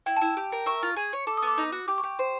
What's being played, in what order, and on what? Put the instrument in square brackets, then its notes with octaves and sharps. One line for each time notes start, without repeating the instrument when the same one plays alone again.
[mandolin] E4 [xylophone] G5
[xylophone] A5
[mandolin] E4
G4
A#4
[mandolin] E5 [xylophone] C#6
[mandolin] F4
G#4
C#5
[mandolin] A4 [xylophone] D6
[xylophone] D#6
[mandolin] B3
[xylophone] D6
[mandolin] D#4
F#4
[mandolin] G4 [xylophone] D6
[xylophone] C#6
[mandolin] G4
C5